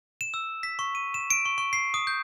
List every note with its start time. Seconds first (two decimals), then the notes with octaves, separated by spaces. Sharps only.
0.21 E7
0.34 E6
0.63 B6
0.79 C#6
0.95 D#7
1.14 E7
1.30 D7
1.45 C#6
1.58 C#6
1.73 C7
1.94 D#6
2.07 G6